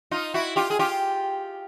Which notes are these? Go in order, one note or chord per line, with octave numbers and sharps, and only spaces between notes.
D#4 F4
E4 F#4
F4 G4
G#4
F4 G4